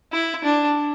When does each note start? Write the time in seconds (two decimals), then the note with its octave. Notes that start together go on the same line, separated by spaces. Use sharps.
0.12 E4
0.44 D4